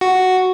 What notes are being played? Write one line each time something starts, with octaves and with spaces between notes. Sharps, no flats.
F#4